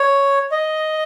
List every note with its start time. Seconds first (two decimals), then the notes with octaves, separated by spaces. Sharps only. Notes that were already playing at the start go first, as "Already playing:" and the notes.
Already playing: C#5
0.52 D#5